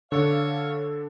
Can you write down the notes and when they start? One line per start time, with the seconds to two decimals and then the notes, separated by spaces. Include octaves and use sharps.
0.12 D3 D4 A4 C#5 F5